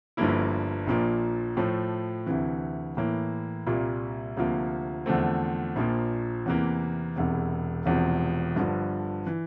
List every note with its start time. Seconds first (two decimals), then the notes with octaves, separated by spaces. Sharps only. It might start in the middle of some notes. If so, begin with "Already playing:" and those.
0.17 G1 G2 F3 A#3 E4
0.87 A#1 A#2 F3 A#3
1.57 A2 F3 A3
2.26 D2 C3 E3
2.97 A2 E3 A#3
3.66 C2 A#2 G3 A#3 F4
4.37 D2 C3 F3 A#3 F4
5.06 E2 D3 F3 A3 C4
5.76 A#1 A#2 F3 A#3
6.46 E2 C3 E3 A#3
7.16 E1 E2 C3
7.86 E1 E2 C3 F3
8.55 G1 G2 D3 F3
9.26 E3